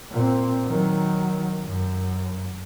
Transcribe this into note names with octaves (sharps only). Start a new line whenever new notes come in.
A#2 C4
D#3 F#3
F#2